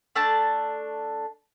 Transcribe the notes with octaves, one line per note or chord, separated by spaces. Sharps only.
A3 D4 A5